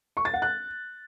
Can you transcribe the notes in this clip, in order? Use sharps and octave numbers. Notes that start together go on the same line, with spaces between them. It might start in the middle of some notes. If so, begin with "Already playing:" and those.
C#6
A6
F#5
F#6